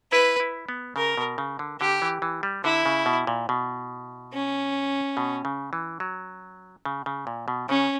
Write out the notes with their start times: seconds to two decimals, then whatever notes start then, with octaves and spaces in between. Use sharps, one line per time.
0.12 E4 B4
0.40 E4
0.69 B3
0.96 C#3 A#4
1.18 B2
1.38 C#3
1.59 D3
1.81 D3 G4
2.02 E3
2.22 E3
2.43 G3
2.64 D3 E4
2.86 C#3
3.06 B2
3.27 A#2
3.49 B2
4.33 C#4
5.17 B2
5.45 C#3
5.73 E3
6.00 F#3
6.85 C#3
7.06 C#3
7.27 A#2
7.48 B2
7.69 C#3 C#4